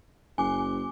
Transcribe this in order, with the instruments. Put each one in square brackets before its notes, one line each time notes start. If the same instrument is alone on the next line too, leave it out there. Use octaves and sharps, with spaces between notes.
[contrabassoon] F#1 [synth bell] G#5 D6